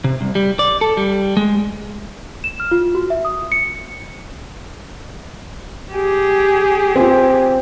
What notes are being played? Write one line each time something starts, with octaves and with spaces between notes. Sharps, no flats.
C3
C2
G3
D5
A4
G3
G#3
E7
F6
F4
F#4
E5
D#6
C#7
G4 G#4
C4 F4